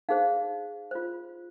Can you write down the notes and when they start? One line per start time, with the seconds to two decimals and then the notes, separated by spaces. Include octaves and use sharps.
0.09 D#4 G#4 C5 F5
0.91 F4 C5